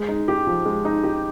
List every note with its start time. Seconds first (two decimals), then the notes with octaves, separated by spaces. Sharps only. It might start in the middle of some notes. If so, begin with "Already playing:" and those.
Already playing: G#3
0.09 D#4
0.28 G4
0.47 F3
0.66 G#3
0.85 D#4
1.04 G4